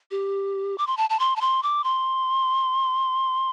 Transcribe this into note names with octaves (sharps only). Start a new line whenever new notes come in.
G4
D6
C6
A5
A5
C6
A5
C6
D6
C6